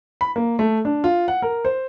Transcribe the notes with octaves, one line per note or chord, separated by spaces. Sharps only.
B5
A#3
A3
D4
F4
F#5
A#4
C5